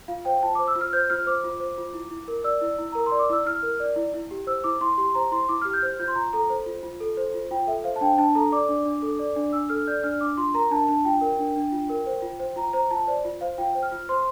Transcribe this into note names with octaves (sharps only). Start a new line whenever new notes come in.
F4 F5
C5 G5
F4 A5
C5 D6
E6
F4
F6
C5 G6
F4 F6
C5 D6
F4
C5
F4
E4
E4
A#4
D5 E6
E4
E4
A#4 A#5
C6
D5
D6
E4 E6
E4 F6
A#4
D5
E4
E4
G4
C5 E6
E4 D6
E4 C6
G4 C6
C5 A#5
E4 C6
E4 D6
G4 F6
G6
C5 F6
F4 G6
C6
F4 A#5
A4 A#5
C5
F4
F4
A4
C5
F4
F4 G5
A4 E5
C5 F5
A5
D4 G5
D4 A5
A4 A#5
D5 D6
D4
D4
A4
D5
D4
D4 E6
A4 F6
D5 G6
D4 F6
D4 D6
F4 C6
A#4 A#5
D4 A5
D4 A5
F4 G5
A#4
D4
D4
F4
A#4
C5
F4
C5
F4 A#5
C5 A#5
F4 A5
C5 D5
F4
C5 F5
F4 G5
C5
F6
F4
C5 C6